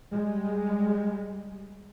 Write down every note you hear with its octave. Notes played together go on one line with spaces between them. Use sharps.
G3 G#3